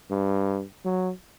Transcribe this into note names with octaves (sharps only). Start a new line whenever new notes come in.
G2
F#3